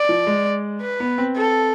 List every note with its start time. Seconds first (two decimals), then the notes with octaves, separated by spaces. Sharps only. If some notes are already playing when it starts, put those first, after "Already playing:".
Already playing: D5
0.09 F3
0.27 G#3
0.82 B4
1.00 B3
1.18 C4
1.37 A4